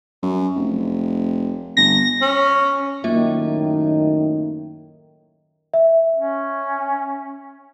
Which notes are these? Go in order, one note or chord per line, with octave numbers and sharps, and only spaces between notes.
F#2
F1
G1 A#6
C#4
F#2 A2 D#3 A#3 F4 E5
E5
C#4